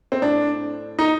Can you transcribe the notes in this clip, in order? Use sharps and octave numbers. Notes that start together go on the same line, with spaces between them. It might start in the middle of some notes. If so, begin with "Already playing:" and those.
C4
A2 D4
D#4